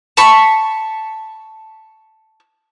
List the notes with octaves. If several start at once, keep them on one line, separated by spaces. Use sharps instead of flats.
A5 B5 C#6